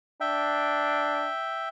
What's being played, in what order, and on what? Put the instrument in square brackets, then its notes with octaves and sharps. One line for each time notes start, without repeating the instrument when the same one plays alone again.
[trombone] D4 [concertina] E5 G5